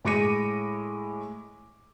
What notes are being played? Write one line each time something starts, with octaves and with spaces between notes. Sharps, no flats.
A2 G#3 D6 A#6 C#7 D#7